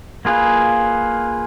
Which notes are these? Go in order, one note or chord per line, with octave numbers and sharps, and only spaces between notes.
A#3 F4 G#4 B4